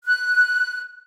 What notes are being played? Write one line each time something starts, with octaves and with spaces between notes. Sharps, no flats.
F#6